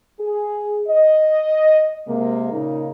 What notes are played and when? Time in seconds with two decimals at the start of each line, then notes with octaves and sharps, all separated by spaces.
0.19 G#4
0.88 D#5
2.07 C3 G#3 A#3
2.51 A#2 C#3 A#3 D#4